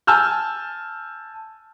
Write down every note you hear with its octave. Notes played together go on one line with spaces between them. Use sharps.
G#5 A5 E6 F6 G6